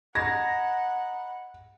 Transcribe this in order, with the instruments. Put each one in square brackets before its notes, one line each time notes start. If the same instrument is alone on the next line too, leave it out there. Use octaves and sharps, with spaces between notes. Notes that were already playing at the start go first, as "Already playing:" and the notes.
[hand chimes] D#5 A#5 B5 [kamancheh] F#5 [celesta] G#6 [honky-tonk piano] A#6